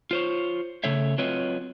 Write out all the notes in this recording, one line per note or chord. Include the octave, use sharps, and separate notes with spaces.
F4 C5 C#5
C#3 A3 A4 C#5 E5
F#3 C4 F4 B4 C#5 D#5